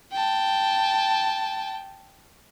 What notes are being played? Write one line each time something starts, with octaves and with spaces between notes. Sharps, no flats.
G5 A5